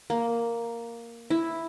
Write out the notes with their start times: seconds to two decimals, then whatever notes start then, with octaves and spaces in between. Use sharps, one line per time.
0.10 A#3
1.30 E4